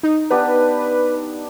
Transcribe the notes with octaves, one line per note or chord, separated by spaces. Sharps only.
D#4
B3 D4 G4 B4